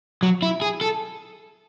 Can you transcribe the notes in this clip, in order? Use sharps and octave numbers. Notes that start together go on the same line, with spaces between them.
F#3
E4
G#4
A4